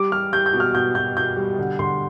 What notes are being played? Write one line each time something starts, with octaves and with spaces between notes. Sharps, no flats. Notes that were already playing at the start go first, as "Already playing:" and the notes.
Already playing: G3 D6
G3 F6
G3 G6
G6
B2
F6
B2 G6
B2 G6
B2 G6
G3
D3
D3 C6